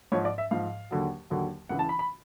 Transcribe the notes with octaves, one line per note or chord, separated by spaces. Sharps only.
G#2 F3 C#5
D5
E5
G#2 F3 F5
D#2 D3 F#3
D#2 D3 F#3
C#2 C#3 E3 F#5
A5
B5
B5